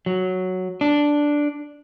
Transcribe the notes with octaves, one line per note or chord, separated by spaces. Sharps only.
F#3
D4